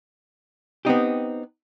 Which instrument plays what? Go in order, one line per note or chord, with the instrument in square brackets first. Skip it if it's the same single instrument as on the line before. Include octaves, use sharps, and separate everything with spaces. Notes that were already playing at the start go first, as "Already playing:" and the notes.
[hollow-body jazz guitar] B3 C4 D#4 G4